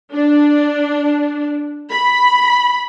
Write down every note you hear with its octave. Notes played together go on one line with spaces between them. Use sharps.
D4
B5